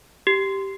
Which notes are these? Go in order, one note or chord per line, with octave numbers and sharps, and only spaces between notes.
G4